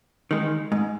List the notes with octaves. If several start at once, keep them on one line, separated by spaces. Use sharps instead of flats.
D#3 G#3
G#2